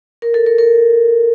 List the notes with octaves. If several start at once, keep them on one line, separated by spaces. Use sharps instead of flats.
A#4
A4
A#4
A#4